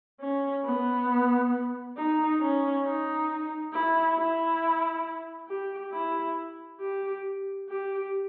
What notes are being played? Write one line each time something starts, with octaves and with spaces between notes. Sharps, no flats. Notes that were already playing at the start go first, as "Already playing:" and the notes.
C#4
B3
D#4
C#4
D#4
E4
E4
G4
E4
G4
G4